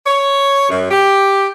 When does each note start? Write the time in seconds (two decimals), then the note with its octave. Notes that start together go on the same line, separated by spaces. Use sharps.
0.06 C#5
0.69 F#2
0.90 G4